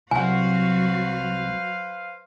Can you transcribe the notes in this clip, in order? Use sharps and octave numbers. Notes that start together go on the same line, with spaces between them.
C2 F#3 F#4 B4 C5 F5 F#5 G#5